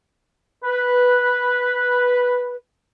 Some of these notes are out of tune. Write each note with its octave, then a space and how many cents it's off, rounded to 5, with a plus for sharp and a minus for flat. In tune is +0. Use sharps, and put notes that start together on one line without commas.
B4 -5